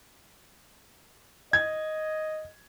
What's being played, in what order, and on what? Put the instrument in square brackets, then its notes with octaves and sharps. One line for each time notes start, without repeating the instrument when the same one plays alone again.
[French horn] D#5 [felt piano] G#6